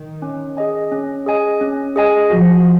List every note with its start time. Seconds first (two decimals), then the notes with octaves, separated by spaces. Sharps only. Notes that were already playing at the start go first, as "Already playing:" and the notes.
Already playing: D#3
0.22 C#4
0.57 G#4 D#5 G#5
0.92 C#4
1.26 G#4 D#5 G#5
1.61 C#4
1.96 G#4 D#5 G#5
2.30 F3 F#4